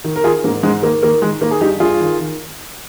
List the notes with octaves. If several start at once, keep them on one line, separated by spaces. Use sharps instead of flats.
D#3
A#4
D#3 F4 G#4
G#2 A#3
G#2 G#3
D#3 A#3
D#3 A#3
D#3 G#3
D#3 A#3
G#4
G2 D#4 G4
G2 F4 G#4
D#3
D#3